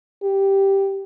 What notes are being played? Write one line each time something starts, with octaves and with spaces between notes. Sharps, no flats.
G4